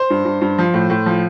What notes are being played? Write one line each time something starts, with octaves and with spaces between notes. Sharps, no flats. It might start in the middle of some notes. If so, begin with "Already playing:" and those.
Already playing: C5 C6
G2
G2
G2
F3
A2
A2
F3